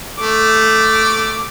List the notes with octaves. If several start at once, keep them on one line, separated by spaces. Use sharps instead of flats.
A3 D6